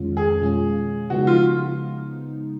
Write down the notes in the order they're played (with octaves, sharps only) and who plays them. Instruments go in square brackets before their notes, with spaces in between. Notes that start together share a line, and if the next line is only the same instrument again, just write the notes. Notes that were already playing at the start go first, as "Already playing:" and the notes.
Already playing: [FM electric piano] F2 D#3 G#3 C#4 F4
[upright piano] G#4
[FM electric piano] B2 G#3 C#4 F4
[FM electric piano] C#3 F3 G#3 B3 D#4 [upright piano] F#4
[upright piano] F4